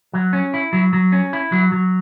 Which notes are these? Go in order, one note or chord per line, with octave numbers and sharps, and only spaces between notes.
F#3
C#4
E4
F#3
F#3
C#4
E4
F#3
F#3